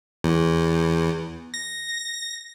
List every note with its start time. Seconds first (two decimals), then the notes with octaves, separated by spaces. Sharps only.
0.24 E2
1.54 A#6